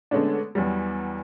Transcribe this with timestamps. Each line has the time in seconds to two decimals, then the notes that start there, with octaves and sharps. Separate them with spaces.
0.11 D3 G#3 A3 B3 C#4 D4
0.55 E2 F#3 G3